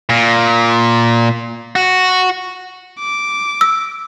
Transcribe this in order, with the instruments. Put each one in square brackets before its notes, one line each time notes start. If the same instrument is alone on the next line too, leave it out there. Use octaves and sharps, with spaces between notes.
[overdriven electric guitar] A#2
F#4
[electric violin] D6
[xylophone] E6